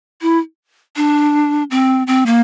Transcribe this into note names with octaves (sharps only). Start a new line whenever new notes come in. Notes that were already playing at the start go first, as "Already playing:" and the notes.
E4
D4
C4
C4
A#3